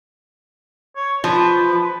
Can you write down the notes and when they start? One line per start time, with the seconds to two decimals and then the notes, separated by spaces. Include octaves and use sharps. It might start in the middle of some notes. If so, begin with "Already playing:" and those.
0.96 C#5
1.24 F3 B4